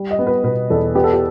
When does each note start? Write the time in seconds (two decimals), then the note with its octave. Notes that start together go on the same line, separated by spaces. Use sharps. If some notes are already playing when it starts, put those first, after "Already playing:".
Already playing: G3
0.11 D#5
0.19 B3
0.27 B4
0.44 B2 B4
0.70 E2 A4
0.95 B3 G4
1.04 A4
1.13 G4